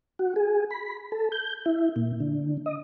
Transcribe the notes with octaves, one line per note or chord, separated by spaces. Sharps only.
F#4
G#4
B5
A4
G6
E4
A#2
D3
D#5